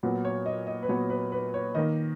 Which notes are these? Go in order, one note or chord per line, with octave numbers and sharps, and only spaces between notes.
A#2 F#3 B3
C#5
D#5
D#5
B4
A#2 F#3 B3 C#5
B4
B4
C#5
D#3 A#3 D#5